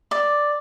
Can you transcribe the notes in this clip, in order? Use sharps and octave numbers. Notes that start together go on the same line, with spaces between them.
D5